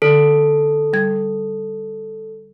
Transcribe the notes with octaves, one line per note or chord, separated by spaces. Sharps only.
D3 A4
G3 G#6